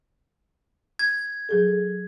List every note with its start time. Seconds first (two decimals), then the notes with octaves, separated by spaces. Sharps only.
0.99 G#6
1.49 F#3 G#4 A4